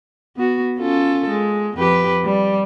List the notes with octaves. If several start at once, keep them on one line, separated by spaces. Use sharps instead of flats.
B3 F#4
C#4 F4 A4
G#3
F2 G4 B4
G3